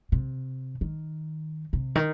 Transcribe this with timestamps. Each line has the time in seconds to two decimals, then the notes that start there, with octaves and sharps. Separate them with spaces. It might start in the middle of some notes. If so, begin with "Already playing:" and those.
0.12 C3
0.81 D#3
1.73 C3
1.95 D#3